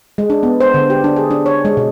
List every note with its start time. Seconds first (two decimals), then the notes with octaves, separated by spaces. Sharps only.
0.18 G#3
0.30 D4
0.43 B3
0.60 C5
0.74 D3
0.90 G4
1.04 D4
1.16 G#4
1.31 D4
1.46 C#5
1.65 G#3
1.77 B2